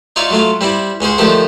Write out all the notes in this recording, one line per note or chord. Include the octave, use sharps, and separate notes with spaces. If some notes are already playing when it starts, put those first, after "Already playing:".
D#4 F4 C#5 D5 E5
F#3 A3 F4
G3 C4 E4 D6
C#2 C#4 G#4 C5
D3 D#3 F3 A3 G4 C5